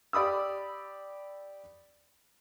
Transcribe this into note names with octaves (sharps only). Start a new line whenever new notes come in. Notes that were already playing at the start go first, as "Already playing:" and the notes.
G4 D5 B5 D#6 E6